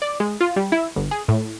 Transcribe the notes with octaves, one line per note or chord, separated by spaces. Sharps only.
D5
G#3
F4
G3
E4
G1
G#4
A2